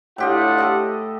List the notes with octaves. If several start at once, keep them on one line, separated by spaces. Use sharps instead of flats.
A2 D4 F4 G4 D#5 F#5
G4 A4 D#5